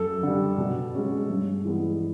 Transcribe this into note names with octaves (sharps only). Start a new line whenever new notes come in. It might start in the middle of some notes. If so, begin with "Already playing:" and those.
Already playing: F#2 A4
D3 G3
B2
G#3 C#4
G2
E3 G#3 B3